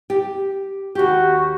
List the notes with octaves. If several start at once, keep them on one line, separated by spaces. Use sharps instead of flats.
G4
D#2 F#4 G4